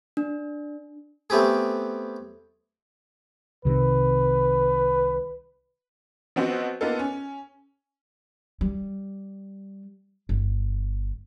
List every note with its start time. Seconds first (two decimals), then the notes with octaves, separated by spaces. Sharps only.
0.17 D4
1.30 A3 B3 C4 G4 G#4
3.65 C2 C3 D#3 B4
6.36 F3 B3 C4 F#4 C5 D#5
6.81 A#3 B3 D#4 F4 A4
6.99 C#4
8.61 G3
10.29 G1